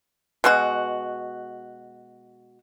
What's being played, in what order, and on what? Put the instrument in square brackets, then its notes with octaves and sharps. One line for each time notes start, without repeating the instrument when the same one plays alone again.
[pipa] B2 G#3 F#4